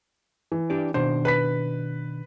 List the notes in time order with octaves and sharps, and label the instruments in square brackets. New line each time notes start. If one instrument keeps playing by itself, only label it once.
[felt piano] E3
[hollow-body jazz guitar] D4 G4 D5
[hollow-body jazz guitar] B2 D#3 D4 [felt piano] C5
[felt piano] B4 B5 B6